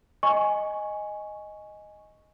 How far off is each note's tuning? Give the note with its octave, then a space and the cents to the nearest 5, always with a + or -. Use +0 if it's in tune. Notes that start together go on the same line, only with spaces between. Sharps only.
D#5 +0 G#5 +0 C#6 +0